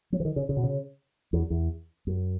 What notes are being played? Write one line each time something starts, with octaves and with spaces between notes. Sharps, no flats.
F#3
E3
D#3
C#3
C#3
B2
C#3
E2
E2
F#2